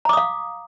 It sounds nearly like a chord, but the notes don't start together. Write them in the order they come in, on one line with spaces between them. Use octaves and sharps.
A#5 D6 D#6 F5